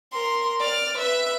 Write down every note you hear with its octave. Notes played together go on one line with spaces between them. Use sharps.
A#4 C6
D5 F6
B4 E5